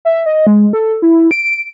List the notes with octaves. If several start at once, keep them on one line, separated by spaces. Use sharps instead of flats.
E5
D#5
G#3
A4
E4
D7